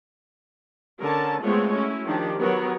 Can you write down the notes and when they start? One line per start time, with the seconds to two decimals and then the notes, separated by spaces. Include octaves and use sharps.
1.01 D3 C#4 A#4 A5
1.42 G#3 A3 B3 C4 F4 C#5
1.74 C#4 E4 F#4
2.06 D#3 F3 D4 G4
2.38 F#3 B3 G4 A#4 C#5